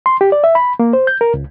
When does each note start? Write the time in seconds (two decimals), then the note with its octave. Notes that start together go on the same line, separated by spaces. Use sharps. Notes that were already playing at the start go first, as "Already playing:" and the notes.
0.06 C6
0.21 G4
0.32 D5
0.44 E5
0.55 B5
0.79 A#3
0.93 C5
1.07 G6
1.21 A#4
1.34 C#2